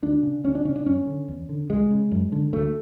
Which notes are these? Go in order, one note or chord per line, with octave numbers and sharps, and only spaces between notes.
D2 D4
C#3
D2 C#4
D4
C#3 C#4
D4
F#2 C#4
D3
E2
D3
C#2 G#3
C#3
F#2
D3
D2 A3